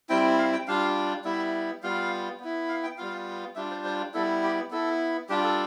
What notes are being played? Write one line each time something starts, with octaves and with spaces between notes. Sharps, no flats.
G3 C4 E4 G5
F5
G5
G3 D4 F4 F5
G3 B3 E4 E5
G3 B3 F4 F5
B3 E4
F5
G5
G3 B3 F4 F5
G3 D4 F4 E5
C5
C5
G3 B3 E4 A4
G4
B3 E4 A4
G3 D4 F4 G4
A4